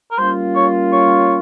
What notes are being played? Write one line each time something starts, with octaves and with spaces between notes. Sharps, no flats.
A#4
G3 A#3 C#4 F4 C5
C#5
C#5